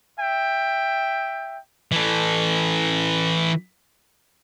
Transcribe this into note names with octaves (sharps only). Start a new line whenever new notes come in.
E5 G5
E3 A4